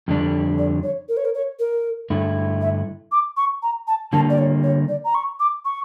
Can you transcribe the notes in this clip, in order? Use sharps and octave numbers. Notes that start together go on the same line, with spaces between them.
F2 D3 G3 D4
D5
C#5
A#4
C#5
A#4
C#5
A#4
G2 D3 A3 E4
E5
D6
C#6
A#5
A5
D3 G3 A#3 A5
D5
C#5
C#5
D5
A#5
C#6
D6
C#6